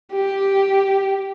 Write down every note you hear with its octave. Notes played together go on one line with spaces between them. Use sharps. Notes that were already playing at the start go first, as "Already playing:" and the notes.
G4